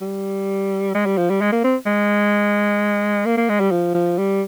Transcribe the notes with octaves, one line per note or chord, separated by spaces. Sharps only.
G3
G#3
G3
F3
G3
G#3
A#3
C4
G#3
A#3
A#3
G#3
G3
F3
F3
G3